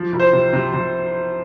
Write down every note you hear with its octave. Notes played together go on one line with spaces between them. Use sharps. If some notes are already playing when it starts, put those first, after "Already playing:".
Already playing: F3
C2
C5
C3
C3
C3